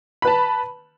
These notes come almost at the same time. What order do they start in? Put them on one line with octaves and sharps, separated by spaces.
B5 B4 A5